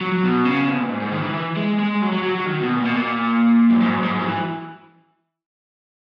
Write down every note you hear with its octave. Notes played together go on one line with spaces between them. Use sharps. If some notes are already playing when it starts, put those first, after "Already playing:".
F#3
F#3
B2
C#3
B2
A#2
G#2
G#2
D#3
E3
E3
G#3
G#3
F#3
F#3
F#3
F#3
D#3
B2
A#2
B2
A#2
F#2
G#2
F#2
G#2
G#2
F#3
E3